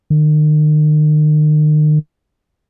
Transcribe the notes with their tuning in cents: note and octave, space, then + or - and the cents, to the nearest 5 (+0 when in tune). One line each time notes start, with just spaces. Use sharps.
D#3 -40